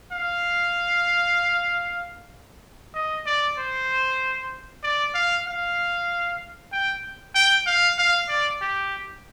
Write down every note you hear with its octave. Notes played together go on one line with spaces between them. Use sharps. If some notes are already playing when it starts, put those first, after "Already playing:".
F5
D#5
D5
C5
D5
F5
F5
G5
G5
F5
F5
D5
G4